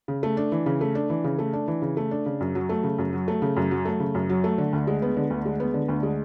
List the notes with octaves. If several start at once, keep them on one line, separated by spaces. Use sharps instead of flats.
C#3
A3
D4
E3
C#3
A3
D4
E3
C#3
A3
D4
E3
C#3
A3
D4
C#3
F#2
F#3
A3
C#3
F#2
F#3
A3
C#3
F#2
F#3
A3
C#3
F#2
F#3
A3
D3
D2
G#3
B3
D3
D2
G#3
B3
D3
D2
G#3